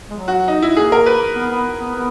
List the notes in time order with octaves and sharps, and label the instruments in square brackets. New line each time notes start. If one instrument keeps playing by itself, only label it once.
[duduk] G#3
F#3
[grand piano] F#4
D#4
E4
[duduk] A#3 [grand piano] G#4
[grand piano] A#4
B4
[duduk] B3
B3
B3
B3